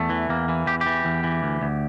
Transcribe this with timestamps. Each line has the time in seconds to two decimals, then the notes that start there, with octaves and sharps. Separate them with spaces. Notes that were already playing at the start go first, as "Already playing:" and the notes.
Already playing: E2 A3
0.10 E3
0.29 E2 A#3
0.49 E3
0.67 E2 G4
0.81 G4
0.86 E3
1.05 E2
1.24 E3
1.43 D2
1.62 D2